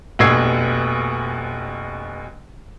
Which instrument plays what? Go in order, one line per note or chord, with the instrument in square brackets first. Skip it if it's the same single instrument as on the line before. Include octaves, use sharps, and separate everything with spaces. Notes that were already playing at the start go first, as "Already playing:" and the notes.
[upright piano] F1 A#1 B2 E6 G#6 C7